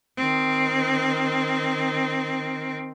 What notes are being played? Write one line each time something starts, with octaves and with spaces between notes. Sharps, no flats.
D#3 C4